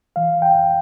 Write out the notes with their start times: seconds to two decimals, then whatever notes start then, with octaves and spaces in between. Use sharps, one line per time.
0.16 E3 F5
0.42 G5
0.55 F2